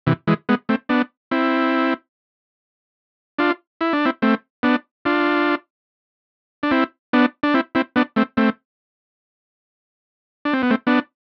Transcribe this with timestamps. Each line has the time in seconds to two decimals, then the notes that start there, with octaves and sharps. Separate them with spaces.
0.07 C3 E3
0.27 E3 G#3
0.49 G#3 B3
0.69 A3 C4
0.89 B3 D4
1.31 C4 E4
3.38 D4 F4
3.81 E4
3.93 D4
4.05 C4 E4
4.22 A3 C4
4.63 B3 D4
5.05 D4 F4
6.63 D4
6.71 C4 E4
7.13 B3 D4
7.43 D4
7.54 C4 E4
7.75 C4 E4
7.96 B3 D4
8.16 A3 C4
8.37 A3 C4
10.45 D4
10.53 C4
10.63 B3
10.70 A3 C4
10.87 B3 D4